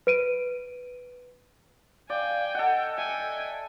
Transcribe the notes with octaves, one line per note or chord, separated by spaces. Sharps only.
B4 D7 D#7
D5 F5 G5 G#5
A4 D#5 F#5
E5 G5 G#5